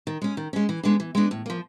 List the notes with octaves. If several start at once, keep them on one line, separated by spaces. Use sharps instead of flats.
D#3
G#3 C#4
D#3
G#3 C#4
E3
G#3 B3 D4
E3
G#3 B3 D4
A2
F3 A#3